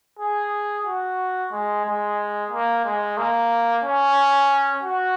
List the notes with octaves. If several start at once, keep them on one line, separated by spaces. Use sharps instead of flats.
G#4
F#4
G#3
G#3
A#3
G#3
A#3
C#4
F#4